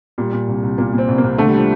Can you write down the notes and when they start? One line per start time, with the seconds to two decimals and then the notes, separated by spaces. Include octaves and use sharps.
0.18 A#2 G3
0.33 A#2
0.48 C2
0.63 C2
0.78 A#2 A#3
0.93 A#2
0.98 C4
1.08 C2
1.18 A#3
1.24 C2
1.38 D3 A3
1.49 G3
1.54 D3 F3